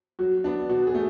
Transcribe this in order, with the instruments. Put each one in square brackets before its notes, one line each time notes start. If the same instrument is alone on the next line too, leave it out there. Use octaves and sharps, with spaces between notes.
[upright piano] F#3 F#4
B3 D4
B2 F#4
G#4
A3